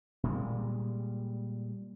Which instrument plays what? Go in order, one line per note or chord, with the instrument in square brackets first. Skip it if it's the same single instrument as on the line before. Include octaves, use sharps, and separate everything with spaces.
[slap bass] A#2 G3 G#3